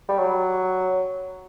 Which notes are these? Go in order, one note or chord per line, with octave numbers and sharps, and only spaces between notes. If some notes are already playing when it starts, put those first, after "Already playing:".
G3
F#3